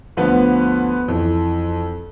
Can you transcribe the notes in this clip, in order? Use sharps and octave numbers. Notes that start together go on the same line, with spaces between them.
D2 D3 F3 B3 B4
F2 E3